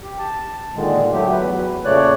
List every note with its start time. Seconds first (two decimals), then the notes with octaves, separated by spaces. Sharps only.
0.02 G4
0.19 A5
0.75 A#2 D3 D#3 G#3
1.12 F#3 A3 G4
1.32 E2 F#3 B4
1.85 A#2 C#3 A3 C#5 D5 F#6